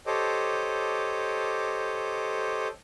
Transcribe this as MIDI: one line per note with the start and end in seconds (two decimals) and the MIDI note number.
0.07 2.68 67
0.07 2.68 69
0.07 2.68 72
0.07 2.68 73
0.07 2.68 75
0.07 2.68 86